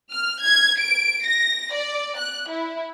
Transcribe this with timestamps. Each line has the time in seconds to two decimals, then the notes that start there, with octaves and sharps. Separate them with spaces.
0.11 F6
0.42 G#6
0.80 D7
1.25 A#6
1.73 D5
2.19 F#6
2.48 E4